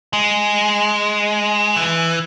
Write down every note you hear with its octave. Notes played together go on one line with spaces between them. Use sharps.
G#3
E3